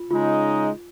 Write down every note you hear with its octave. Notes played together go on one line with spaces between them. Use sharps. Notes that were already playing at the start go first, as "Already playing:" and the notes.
Already playing: F4
C#3 G#3 D#4 F4